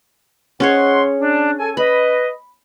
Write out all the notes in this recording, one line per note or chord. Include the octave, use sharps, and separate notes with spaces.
G#2 C#4 G#4 C#5 F#5 C6
D4
A4 G#5
B4 D#5 B5